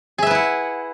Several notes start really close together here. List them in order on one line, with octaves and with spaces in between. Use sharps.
G#4 E5 B4 E4 F#5